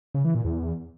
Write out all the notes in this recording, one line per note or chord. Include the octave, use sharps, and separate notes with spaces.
C#3
E3
A#2
E2